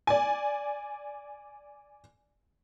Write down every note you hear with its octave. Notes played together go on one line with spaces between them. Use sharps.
D5 G#5